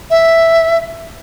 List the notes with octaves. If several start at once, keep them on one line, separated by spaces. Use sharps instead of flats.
E5